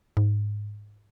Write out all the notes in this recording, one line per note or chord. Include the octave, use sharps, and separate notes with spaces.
G#2